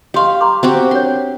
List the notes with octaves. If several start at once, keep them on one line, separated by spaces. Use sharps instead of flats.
G4 D#5 F5 C6 C#6
A#5 C6 D6
C4 F#4 G4
D4 A#4 C#5 C6